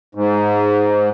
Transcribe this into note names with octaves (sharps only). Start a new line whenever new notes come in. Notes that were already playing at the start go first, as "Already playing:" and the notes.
G#2